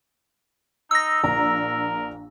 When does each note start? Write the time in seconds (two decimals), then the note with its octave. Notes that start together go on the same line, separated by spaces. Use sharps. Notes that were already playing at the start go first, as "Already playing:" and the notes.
0.91 D#4 E6 A#6
1.23 A#1 D4 A#4 A#5